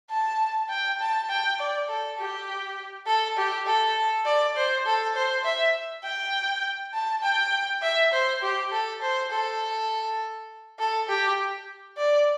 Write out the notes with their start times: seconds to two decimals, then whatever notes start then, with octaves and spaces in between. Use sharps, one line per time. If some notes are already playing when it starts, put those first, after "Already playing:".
0.10 A5
0.69 G5
1.00 A5
1.29 G5
1.59 D5
1.88 A4
2.18 G4
3.07 A4
3.37 G4
3.66 A4
4.25 D5
4.56 C5
4.86 A4
5.16 C5
5.45 E5
6.04 G5
6.94 A5
7.23 G5
7.82 E5
8.12 C5
8.42 G4
8.71 A4
9.02 C5
9.30 A4
10.79 A4
11.09 G4
11.97 D5